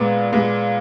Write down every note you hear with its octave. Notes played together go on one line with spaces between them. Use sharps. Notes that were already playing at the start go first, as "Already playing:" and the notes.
Already playing: A#2 G#3 B3 D5
A#2 G#3 B3